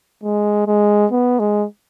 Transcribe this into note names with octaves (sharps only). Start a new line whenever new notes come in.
G#3
G#3
B3
G#3